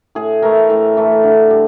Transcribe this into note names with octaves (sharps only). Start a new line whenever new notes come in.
A2 G#4
E3 A3 A#4
A2
E3 A3
D3
G3